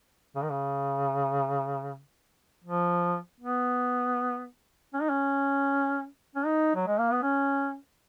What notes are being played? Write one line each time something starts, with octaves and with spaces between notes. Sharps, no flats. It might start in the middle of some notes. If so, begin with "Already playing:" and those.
C#3
D#3
C#3
F3
B3
C#4
D#4
C#4
C#4
D#4
F#3
G#3
A#3
B3
C#4